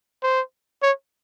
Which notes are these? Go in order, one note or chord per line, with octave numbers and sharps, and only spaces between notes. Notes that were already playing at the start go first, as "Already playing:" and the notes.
C5
C#5